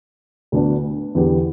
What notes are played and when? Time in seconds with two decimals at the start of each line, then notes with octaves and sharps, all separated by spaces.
0.52 D2 D3 B3 D4
1.14 E2 D3 B3 G4